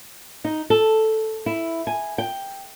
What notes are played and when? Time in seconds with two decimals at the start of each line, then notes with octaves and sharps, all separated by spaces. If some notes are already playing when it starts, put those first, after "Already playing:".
0.44 D#4
0.70 A4
1.46 E4
1.87 G#5
2.18 G5